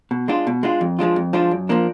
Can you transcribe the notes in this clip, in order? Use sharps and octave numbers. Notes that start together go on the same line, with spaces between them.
B2
G#3 D4 F4
B2
G#3 D4 F4
F2
F3 G#3 D4 F4
F2
F3 G#3 D4 F4
F#2
F3 A#3 D4